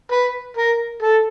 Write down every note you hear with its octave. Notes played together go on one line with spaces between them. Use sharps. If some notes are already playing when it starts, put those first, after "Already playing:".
B4
A#4
A4